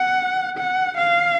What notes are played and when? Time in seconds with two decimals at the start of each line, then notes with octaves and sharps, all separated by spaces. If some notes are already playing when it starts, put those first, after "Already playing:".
Already playing: F#5
0.58 F#5
0.98 F5